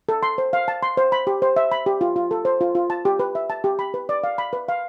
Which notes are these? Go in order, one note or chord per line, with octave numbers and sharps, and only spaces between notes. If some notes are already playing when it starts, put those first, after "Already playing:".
A4
C6
C5
F5
A5
C6
C5
B5
G4
C5
E5
B5
G4
F4
F4
A4
C5
F4
F4
A5
G4
B4
E5
A5
G4
B5
B4
D5
F5
B5
B4
F5